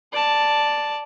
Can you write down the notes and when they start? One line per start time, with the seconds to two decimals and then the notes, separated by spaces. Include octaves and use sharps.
0.12 D5 A5